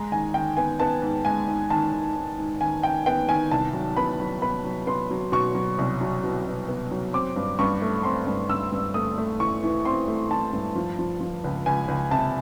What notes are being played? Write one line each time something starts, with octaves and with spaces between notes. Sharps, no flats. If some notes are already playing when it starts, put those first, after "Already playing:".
Already playing: G#3 A#5
D#3 G#5
D#3 G5
B3 G#5
B3 A5
G#2
G#3 G#5
G#2
D#3 A5
D#3
G#2
G#2
D#3 G#5
D#3 G5
B3 G5
D#3 G#5
C2 A5
F#3
B3 B5
F#3
B3 B5
F#3
B3 C6
F#3
B2 C#6
F#3
C2
F#3
B2
B2
B3
F#3
C4 D6
G2
G2 C#6
A3
C4 C6
G2
G2 E6
G2
A3 D#6
A3
E3 C#6
E3
C4 C6
A3
E3 A5
G2
F3
F3
F3
C#2
C#2 G#5
C#2
C3 A5